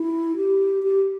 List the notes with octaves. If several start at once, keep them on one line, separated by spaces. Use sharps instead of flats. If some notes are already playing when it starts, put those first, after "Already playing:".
Already playing: E4
G4
G4